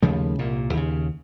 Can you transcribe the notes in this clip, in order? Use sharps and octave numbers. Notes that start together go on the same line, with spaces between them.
D#2 C#3 F3 A3
C2 A#2
D#2 C#3